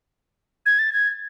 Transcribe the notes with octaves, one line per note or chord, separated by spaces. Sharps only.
G#6
A6
G#6